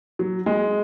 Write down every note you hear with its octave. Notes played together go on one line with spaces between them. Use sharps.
F#3
G#3